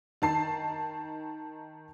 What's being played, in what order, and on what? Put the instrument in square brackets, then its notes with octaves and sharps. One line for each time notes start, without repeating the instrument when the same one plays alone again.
[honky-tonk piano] D#3 A5 C7